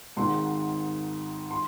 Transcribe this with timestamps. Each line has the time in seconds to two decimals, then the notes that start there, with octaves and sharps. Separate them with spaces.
0.17 G#1 G#2 D#3 C6
1.51 C6